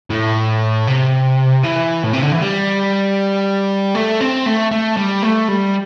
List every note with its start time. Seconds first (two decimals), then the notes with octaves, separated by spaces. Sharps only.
0.10 A2
0.87 C3
1.64 E3
2.04 A2
2.13 C3
2.22 D3
2.31 E3
2.41 G3
3.95 A3
4.21 C4
4.46 A3
4.71 A3
4.97 G3
5.23 A3
5.48 G3